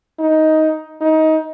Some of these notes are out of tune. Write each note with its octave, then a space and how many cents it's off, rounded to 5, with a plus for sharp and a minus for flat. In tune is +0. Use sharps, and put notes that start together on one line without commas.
D#4 +10
D#4 +20